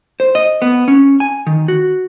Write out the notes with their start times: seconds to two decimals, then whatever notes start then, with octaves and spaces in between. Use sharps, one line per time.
0.20 C5
0.35 D#5
0.62 B3
0.88 C#4
1.20 G#5
1.47 D#3
1.68 F#4